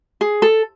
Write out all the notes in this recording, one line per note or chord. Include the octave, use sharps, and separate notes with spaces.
G#4
A4